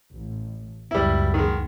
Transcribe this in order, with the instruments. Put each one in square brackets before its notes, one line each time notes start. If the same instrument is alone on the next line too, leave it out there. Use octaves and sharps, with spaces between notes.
[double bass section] A1
[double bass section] C#2 F#2 B3 [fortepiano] G3 E4
[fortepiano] D#3 G#3